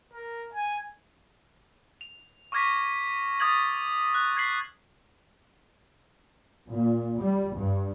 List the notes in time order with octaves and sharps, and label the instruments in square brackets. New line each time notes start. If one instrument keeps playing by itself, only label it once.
[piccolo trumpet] A#4
G#5
[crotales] F7
C#6 D6 F6 G#6 A#6 B6
C#6 D#6 F6 G#6 A6 F#7
F#6
G#6 B6 C7 F#7
[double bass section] A#2
G3
G2